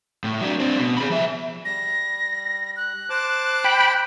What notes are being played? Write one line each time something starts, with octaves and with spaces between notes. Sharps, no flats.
A2
F#3 D4
C4 D4
B2
G#4 B5
F3 E5
G3 A#6
F#6
C5 A5 D6
G5 B5